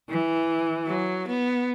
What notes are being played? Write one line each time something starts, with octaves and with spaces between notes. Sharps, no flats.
E3
F#3
B3